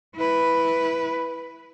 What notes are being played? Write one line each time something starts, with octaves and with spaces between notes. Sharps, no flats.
E4 B4